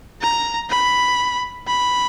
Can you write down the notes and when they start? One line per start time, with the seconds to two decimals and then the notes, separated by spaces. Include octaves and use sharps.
0.22 A#5
0.70 B5
1.67 B5